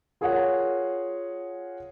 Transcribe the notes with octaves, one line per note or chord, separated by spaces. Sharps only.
F4 G#4 A#4 C#5 F5 F#5